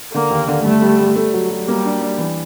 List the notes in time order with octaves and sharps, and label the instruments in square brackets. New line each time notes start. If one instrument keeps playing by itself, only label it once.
[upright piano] D3 [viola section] A#3
[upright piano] D#2
D3
[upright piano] G2 [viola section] A3
[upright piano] G3
G3
A3
F#3
F#3
[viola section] G3 [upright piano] A#3
[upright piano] D4
D4
E3